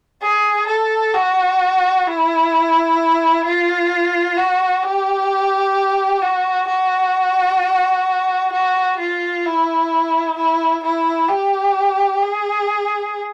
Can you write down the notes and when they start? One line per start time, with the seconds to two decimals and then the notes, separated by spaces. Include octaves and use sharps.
0.21 G#4
0.67 A4
1.14 F#4
2.06 E4
3.45 F4
4.37 F#4
4.83 G4
6.22 F#4
6.68 F#4
8.53 F#4
8.99 F4
9.45 E4
10.37 E4
10.84 E4
11.29 G4
12.22 G#4